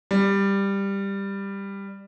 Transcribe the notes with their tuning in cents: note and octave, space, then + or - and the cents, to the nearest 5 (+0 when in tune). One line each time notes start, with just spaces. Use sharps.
G3 +10